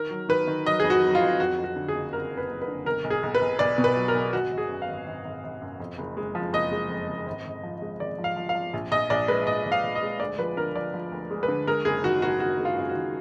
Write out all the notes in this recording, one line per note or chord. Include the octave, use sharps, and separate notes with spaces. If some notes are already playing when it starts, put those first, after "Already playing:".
Already playing: D#3 A#4
F#3
D#3 B4
D#3
F#3 D#5
F2 G#4
F#4
F#3
F4
F2
F2 F#4
F2
F#4
D3
G#4
F#1
F#1 A#4
F#1
B4
F#1
B4
D3
B1 A#4
B1
G#4
B1
B4
B1
B1 D5
B2
B4
F#3
A#4
B1
G#1 F#4
G#1
G#4
F#2
F5
G#1
G#1
G#1
G#1
F#2
F2
F#1
G#3
F3
F#1 D#5
G#3
F2
F#1
G#1
G#1
F3
G#3
G#1 D5
F3
F5
F3
F5
F3
A#1
A#1 D#5
A#1 D5
G#3 B4
A#1 D#5
A#1
F5
A#1
D#5
G#3
D2 D5
F3 B4
D3 A#4
F3 D5
F3
D2
G#3
B4
D3
G#3 A#4
F#1 G#4
D#3 F#4
F#1 F#4
F#1 F#4
G#3
F4
F#2 F4
F#4
D#3